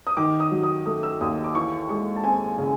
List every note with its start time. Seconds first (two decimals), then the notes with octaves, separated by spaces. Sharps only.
0.07 D#6
0.17 D#3 D6
0.40 D#6
0.51 F#3
0.63 D#6
0.86 A3 D#6
1.03 E6
1.21 D#2 D#6
1.44 D6
1.55 E3 C#6
1.89 G#3 C#6
2.16 A5
2.24 C4 G#5
2.58 C#3